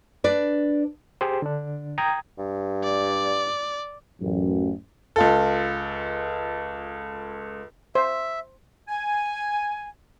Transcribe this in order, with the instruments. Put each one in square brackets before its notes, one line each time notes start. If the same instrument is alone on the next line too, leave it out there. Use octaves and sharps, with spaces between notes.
[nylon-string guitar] D4 B4 D5
[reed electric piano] G4 G#4 C5
D3 D4
G5 A#5 D#6 G#6
[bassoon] G2
[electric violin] D5
[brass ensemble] A1 F#2
[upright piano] C#2 F4 A4
[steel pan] C5 [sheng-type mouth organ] E5
[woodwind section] G#5